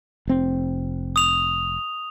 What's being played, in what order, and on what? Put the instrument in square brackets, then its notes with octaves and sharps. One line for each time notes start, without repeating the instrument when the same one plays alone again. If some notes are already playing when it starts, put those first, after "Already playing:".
[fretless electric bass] F1 C4
[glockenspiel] D#6 F7